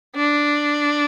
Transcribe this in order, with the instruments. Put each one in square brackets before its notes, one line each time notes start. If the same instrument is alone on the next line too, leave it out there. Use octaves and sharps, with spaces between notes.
[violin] D4